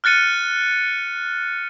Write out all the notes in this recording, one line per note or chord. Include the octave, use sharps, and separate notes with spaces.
F6 F#6 A6 C#7 D#7